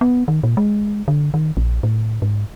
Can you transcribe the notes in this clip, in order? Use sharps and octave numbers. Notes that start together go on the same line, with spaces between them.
B3
D#3
A#2
G#3
D3
D#3
A#1
A2
G#2